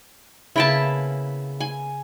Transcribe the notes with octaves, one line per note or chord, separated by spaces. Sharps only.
C#3 A#3 B3 E4 G5 A5
G#5